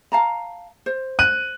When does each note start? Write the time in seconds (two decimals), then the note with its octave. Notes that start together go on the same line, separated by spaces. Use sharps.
0.12 F5 A5 A#5
0.86 C5
1.19 F#6 D#7